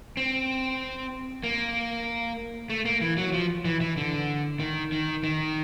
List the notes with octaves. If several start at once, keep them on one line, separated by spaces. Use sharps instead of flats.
C4
A#3
A3
A#3
E3
F#3
F3
E3
E3
D3
D#3
D#3
D#3